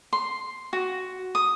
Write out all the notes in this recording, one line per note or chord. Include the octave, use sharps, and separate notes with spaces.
C6
F#4
D#6